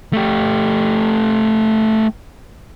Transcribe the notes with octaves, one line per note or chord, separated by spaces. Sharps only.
A3 G4